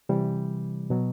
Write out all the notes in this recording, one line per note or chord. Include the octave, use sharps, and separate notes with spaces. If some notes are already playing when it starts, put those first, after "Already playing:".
C3 E3 G3
B2 F#3